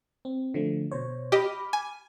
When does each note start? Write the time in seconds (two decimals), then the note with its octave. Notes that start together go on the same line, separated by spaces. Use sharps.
0.25 C4
0.54 D3 F3 A3
0.91 B2 C5 C#5
1.32 G4 D#5 B5 D6 F6
1.73 G#5